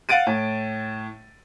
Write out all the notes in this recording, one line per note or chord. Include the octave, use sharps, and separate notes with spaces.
F5 F#5 A6 D7 D#7
A2